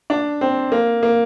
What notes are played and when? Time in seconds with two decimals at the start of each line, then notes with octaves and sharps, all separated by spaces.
0.10 D4
0.41 C4
0.72 A#3
1.03 A#3